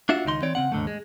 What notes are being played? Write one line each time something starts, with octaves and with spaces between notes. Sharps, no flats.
D4 F4 F#4 E5
C#2 D#3 D#4 C6
E3 C4 C#5 D5
C#3 C4 F#5
D#2 G#2 D3 F#3 A3
G#3